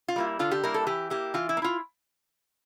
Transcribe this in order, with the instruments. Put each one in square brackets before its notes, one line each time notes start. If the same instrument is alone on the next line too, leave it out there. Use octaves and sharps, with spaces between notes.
[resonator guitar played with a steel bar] F4
G3 A#3 E4
D3 F4
G4
G3 A#3 E4 A#4
A4
E3 G4
A#3 E4 G4
E3 F4
E4
A#3
E4 F4